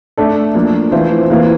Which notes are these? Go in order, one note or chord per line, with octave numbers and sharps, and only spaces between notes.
A3 D4 A4 D5
F3 A#3 D4
E3 A3 C4 F4 C5
E3 A#3 F4